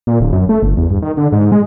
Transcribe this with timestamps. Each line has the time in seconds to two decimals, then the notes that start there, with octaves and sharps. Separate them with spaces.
0.07 A#2
0.21 D1
0.33 F#2
0.49 A3
0.63 G1
0.77 E2
0.90 G2
1.02 D#3
1.17 D3
1.32 G#2
1.52 G#3